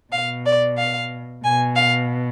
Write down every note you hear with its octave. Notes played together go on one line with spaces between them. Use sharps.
B2 F5
D5
F5
B2 G#5
F5